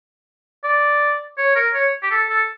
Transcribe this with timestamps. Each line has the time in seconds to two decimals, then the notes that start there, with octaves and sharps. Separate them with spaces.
0.64 D5
1.38 C#5
1.56 A#4
1.74 C#5
2.03 G4
2.11 A4
2.29 A4